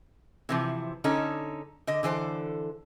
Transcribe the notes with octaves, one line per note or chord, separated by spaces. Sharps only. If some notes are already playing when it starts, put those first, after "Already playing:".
C3 E3 F3
D3 C#4 D#4 A4
D3 D#5
D3 E3 A4 C5